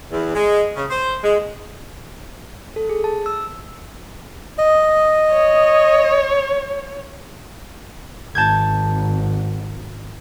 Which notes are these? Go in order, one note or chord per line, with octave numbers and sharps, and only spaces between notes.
E2
G#3
C#3
C5
G#3
A4
G#4
A5
E6
D#5
C#5
G#1 A5 G6 G#6